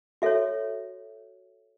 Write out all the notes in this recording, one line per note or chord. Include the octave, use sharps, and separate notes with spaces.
F#4 A4 C#5 E5